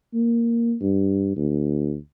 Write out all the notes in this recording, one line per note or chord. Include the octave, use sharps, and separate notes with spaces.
A#3
G2
D2